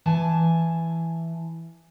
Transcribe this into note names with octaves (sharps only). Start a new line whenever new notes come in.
E3 G#5 A5